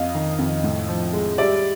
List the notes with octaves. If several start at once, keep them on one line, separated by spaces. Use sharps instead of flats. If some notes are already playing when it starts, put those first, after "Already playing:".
Already playing: F2 D#5 F5
D#3
F2
A2
F3
G#3
G3 D5 E5